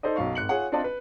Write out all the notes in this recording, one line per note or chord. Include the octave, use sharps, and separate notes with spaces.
D#4 A4 C5 D5 D#5
B1 F#2 F5 C#6
G#1 F#6 C#7 F#7
F4 G#4 C#5 F#5
C4 D4 F4 D5 D#5 A5
B4